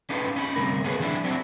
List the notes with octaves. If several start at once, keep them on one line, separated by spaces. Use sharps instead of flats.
C#4 D#4 F4 G4 A4 B4
C#4 D#4 G5 B5
D2 G2 C3 A#4
B3 C#4 F4 F#4 G#4 B4
D#3 F3 G3 D4 E4
F#3 G3 C4 D4 E4 F#4